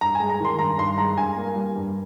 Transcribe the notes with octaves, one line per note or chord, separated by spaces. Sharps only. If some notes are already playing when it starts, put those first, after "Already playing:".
G2 A#5
G#5
G#3
A#5
D#3 C6
G2 A#5
G2 C6
G#3 A#5
G2 G#5
A#3
G3
G2